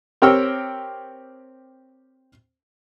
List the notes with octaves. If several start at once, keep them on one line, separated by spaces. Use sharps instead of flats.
C4 G4 A#4 C#5 G5 E6